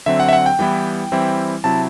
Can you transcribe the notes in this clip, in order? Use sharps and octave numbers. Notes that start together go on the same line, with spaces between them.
D3 F#3 C4 E5
F#5
E5
F#5
G5
E3 G3 B3 E4
E3 G3 C4 E4
C3 F#3 C4 E4 A5